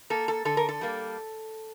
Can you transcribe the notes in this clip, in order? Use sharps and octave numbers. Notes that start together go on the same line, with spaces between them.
A#3 A4
A4
D3 A4
A#4
A4
G3 A#3